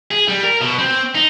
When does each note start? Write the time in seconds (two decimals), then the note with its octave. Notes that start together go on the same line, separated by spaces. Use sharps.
0.11 G#4
0.28 G3
0.43 A#4
0.61 B2
0.79 C4
1.15 D#4